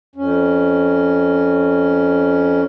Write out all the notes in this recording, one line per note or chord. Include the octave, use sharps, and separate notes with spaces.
F2 C#4